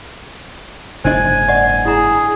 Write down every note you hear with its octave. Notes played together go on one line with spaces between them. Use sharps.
F#1 G#2 D4 C5 D#5 G#5
D5 D#5 F#5
E4 G#4 A#5